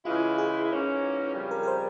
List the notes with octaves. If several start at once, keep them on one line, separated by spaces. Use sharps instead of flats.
C#3 E3 G#3 E4 F4
G#4
G#2 E3 A#3 C#4
F2 C#3 G3
A#4
A#4
C5